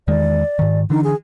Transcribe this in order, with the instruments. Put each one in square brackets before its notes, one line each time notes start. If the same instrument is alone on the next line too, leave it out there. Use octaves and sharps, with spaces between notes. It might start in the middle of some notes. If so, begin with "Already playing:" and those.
[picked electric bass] E2 D#3 G#3 [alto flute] D5
[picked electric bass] G#2 D#3
[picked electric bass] D3 E3 D4 [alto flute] D#4
[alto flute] G#4